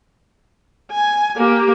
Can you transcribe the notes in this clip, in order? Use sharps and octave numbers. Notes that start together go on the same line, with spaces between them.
G#5
A#3 G4